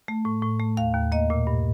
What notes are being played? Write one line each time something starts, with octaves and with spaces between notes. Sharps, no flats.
A3
A2
A2
A3
D#2 F5
D#2
A#3 D#5
A#2
G2